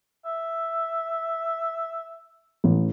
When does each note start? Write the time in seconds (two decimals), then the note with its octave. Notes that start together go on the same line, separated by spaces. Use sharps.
0.26 E5
2.64 A1